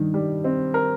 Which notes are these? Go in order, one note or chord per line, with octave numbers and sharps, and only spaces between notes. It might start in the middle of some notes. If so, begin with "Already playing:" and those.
Already playing: G2 D#3
G3
C4
A#4